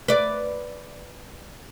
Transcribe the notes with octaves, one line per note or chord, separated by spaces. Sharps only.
B4 D5